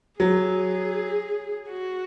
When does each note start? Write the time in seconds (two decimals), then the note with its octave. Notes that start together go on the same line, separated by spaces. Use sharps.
0.20 F#3 G#4
1.69 F#4